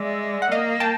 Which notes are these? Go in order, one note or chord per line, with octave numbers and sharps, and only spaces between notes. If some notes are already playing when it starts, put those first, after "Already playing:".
Already playing: G#3 D5 E5
F#5
A#3 D#5 F5
G5 A5